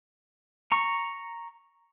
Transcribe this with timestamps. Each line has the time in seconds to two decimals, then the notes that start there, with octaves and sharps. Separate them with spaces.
0.72 A#5 C#6